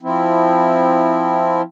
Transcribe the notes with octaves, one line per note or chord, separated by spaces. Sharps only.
F3 C4 E4